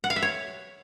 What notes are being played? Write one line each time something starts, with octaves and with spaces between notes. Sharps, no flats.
F#5
F5
E5
C#5